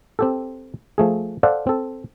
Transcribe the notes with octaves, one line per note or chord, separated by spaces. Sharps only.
C4 G4 A4
F3 A3 G#4
A4 C5 D5 F5 F#5
C4 A4